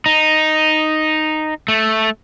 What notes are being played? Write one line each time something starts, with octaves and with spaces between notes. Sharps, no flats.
D#4
A3